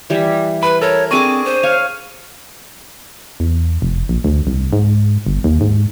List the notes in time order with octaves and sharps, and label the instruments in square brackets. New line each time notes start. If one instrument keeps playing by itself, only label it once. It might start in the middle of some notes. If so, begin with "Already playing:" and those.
[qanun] E3 G3
[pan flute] B4 [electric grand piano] B5
[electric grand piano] A4 A#4 [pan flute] C#5
[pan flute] C4 [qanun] D4 G#4 D6 [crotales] C#6 D#7
[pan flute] C5
[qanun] C#5 F5 G#5
[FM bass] E2
F1
A#1
D2
C2
G#2
G1
D#2
G#2